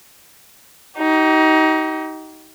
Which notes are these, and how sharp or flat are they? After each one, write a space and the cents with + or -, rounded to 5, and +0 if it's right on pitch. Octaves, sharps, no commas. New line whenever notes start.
D#4 +20 G4 -40